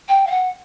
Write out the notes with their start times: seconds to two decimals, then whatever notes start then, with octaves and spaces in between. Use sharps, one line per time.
0.08 G5
0.27 F5
0.30 F#5